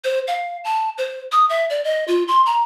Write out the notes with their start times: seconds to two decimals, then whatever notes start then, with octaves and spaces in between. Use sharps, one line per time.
0.04 C5
0.28 F5
0.64 A5
0.98 C5
1.32 D#6
1.50 E5
1.70 D5
1.84 D#5
2.08 F4
2.28 C6
2.46 A#5